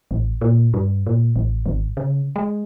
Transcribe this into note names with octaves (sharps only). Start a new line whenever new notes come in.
A1
A#2
G2
A#2
A1
G#1
C#3
G#3